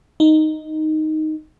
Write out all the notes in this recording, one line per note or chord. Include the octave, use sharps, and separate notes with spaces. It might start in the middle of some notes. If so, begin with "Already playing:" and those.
D#4